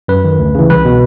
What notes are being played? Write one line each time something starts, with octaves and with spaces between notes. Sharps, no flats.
F#2 B4
D#3
D2
C#3 E3
C2 B4
B2